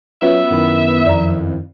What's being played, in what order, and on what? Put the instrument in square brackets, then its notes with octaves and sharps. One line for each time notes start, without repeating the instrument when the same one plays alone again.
[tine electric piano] F#3 [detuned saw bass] B3 [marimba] C#4 F4 B4 [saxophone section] E5
[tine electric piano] F#2 D#3 E4
[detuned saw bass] F2 [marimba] D5 A#5